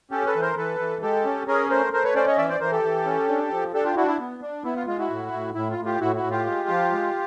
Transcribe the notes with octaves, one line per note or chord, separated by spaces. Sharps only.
C#4 G4 A4
A4 B4
E3
A#4 C5
E3 A4 B4
E3
G#3 G4 A4
C#4
C#4 G#4 A#4
A3 A#4 C5
A3 A#4 C5
B4 C#5
C#4 C5 D5
C#5 D#5
E3 D5 E5
C5 D5
E3 A#4 C5
G4 A4
E3
C#4
D4
F3
D4 G4 A4
F4 G4
D4 E4 F#4
E4
B3
D4
B3 E4
F4
G#3 F4
E4 F#4
A2
A2
A2 E4
F4
A2
F4 G4
A2 E4 F#4
E4 F#4
A2
F4 G4
G#3
F3
G#3